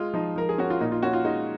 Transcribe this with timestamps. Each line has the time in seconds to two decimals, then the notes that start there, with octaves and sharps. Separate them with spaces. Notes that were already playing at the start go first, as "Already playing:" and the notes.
Already playing: G#3 F4
0.14 F3 D#4
0.36 F3 A#4
0.49 G#4
0.58 C#4 F#4
0.70 F4
0.81 A#2 D#4
0.92 F4
1.03 C#4 F#4
1.13 F4
1.25 G#3 D#4